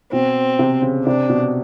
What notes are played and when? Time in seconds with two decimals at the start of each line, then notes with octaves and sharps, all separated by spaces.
0.12 B2 C4
0.59 C3
0.82 C#3
1.06 C3 D4
1.29 B2